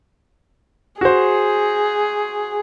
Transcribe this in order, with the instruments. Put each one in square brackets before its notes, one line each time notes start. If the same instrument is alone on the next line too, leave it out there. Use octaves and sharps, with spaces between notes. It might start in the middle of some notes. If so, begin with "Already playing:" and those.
[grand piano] F#4 C5 [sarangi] G#4